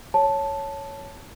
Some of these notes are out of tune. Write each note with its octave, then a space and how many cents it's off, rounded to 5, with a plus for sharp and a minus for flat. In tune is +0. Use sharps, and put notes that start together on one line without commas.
C#5 +0 A5 +0